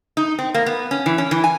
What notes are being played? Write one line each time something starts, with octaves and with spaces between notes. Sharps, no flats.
D#4
C4
A#3
B3
C#4
E3
C#4
E3
G#5